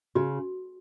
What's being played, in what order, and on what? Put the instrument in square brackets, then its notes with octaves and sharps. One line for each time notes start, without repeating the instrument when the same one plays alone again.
[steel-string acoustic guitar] C#3 [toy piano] F#4